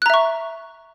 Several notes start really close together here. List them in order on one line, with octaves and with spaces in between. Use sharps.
F#6 A#5 E5 C#6